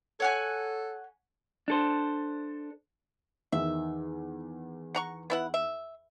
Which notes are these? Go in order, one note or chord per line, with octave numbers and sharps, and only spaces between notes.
A4 C#5 F#5 G#5
D4 A4 C5
E2 D#3 E5
F#5 A#5 C#6
B3 E4 F#5
E5